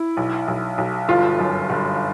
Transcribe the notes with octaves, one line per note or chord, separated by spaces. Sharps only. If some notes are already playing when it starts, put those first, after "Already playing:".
Already playing: E4
B1
B1
B1
G1 F4
F#2
G1